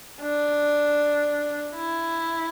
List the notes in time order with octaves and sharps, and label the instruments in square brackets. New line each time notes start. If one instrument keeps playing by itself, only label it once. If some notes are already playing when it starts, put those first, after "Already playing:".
[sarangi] D4
E4